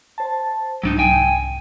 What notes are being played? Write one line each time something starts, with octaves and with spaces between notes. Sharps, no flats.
C5 A5
C2 G#2 F#3 D4 D#4
G5 G#5